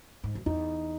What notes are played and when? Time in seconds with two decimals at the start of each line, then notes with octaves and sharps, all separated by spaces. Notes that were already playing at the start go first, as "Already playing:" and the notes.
0.24 G#2
0.35 F#2
0.46 E2 D#4